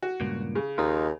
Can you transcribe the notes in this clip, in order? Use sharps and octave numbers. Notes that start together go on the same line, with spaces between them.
F#4
C#2 G2 A#2
C#3
D#2 D#4 F4